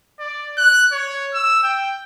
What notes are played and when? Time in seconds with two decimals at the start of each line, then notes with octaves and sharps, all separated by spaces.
0.19 D5
0.58 F#6
0.92 C#5
1.34 E6
1.63 G5